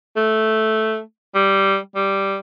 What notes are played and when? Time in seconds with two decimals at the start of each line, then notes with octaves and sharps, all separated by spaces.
0.16 A3
1.35 G3
1.95 G3